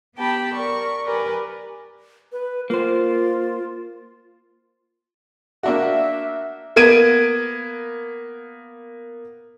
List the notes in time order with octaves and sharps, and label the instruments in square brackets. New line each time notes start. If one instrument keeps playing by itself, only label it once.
[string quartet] B3 G4 G5 A5 B5
A#4 D5 C#6
G4 A#4 B4 D5 G#5
[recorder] B4
[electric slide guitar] A#3 C5 [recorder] F4
[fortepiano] A#3 D4 F#4 [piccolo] E5
[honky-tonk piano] A#3 B3 G#6 D7 D#7